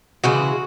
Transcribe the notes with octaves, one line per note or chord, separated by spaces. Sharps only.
C#3 E3 G#3 F#4